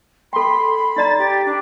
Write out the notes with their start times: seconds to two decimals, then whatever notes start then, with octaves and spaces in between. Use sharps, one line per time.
0.33 A4 G5 B5 C6
0.96 D#4 D5 A#5 A6
1.18 G4
1.46 D4